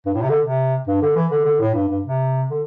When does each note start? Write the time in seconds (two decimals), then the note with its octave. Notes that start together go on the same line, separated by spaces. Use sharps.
0.06 G2
0.14 A2
0.22 C3
0.29 D3
0.45 C3
0.87 G2
1.02 D3
1.16 E3
1.32 D3
1.45 D3
1.60 A2
1.74 G2
1.88 G2
2.03 C3
2.50 D3